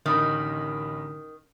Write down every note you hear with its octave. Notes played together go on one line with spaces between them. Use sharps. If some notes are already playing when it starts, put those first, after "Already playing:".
A1 D3 D#3 A#4 B5